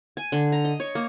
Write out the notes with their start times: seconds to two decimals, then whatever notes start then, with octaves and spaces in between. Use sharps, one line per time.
0.17 G#5
0.32 D3
0.52 A#5
0.65 D#5
0.80 C#5
0.95 A#3